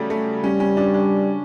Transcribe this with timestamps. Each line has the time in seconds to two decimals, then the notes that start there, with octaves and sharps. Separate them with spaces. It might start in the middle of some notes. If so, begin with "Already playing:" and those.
Already playing: C#3 F#3 G3 A3
0.10 A3
0.44 G3 C#4
0.60 C#4
0.77 D4
0.94 D4